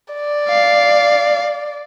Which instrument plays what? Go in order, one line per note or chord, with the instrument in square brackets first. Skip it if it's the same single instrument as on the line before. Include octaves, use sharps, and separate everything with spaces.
[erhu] D5
[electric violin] F5